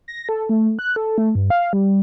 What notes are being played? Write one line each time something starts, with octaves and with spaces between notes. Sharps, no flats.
A#6
A4
A3
F#6
A4
A3
G2
F5
G3